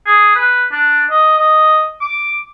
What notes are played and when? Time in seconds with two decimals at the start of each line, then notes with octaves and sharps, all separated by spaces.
0.06 G#4
0.35 B4
0.72 D4
1.11 D#5
1.38 D#5
2.01 D6